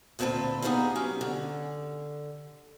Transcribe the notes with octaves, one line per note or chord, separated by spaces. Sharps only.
D2 A#2 C4 D#4 A4 B4
G3 A#3 B3 D#4 F4 G#4
F#3 C#4 G4
D3